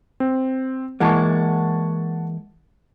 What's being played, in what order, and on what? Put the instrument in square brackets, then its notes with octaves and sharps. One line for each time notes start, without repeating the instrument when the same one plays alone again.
[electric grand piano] C4
[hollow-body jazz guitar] E3 G#3 A#3 [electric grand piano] F#5 A5 C#6